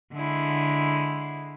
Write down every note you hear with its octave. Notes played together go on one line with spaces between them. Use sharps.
D3 G#3 E4